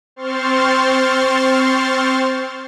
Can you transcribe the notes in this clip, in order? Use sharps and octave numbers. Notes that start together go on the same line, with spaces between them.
C4 C5 C6 C#6 F6 A6